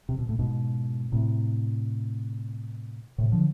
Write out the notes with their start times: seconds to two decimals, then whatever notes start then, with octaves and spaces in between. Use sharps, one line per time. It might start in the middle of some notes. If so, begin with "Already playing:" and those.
0.09 C3
0.19 B2
0.29 A2
0.39 G#2 B2
1.12 A2 C3
3.18 A2 C3
3.32 D3 F3